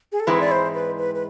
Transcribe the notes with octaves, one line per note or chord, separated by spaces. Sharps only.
G#4
A4
G#2 E3 G#3 C4 E4 B4
D5
C5
B4
B4
B4